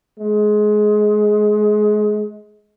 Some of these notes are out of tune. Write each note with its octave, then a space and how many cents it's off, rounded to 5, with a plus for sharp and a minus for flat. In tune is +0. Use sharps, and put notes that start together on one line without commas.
G#3 +20